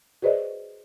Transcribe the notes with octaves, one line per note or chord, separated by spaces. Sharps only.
F#4 G#4 B4 C5 D5 D#5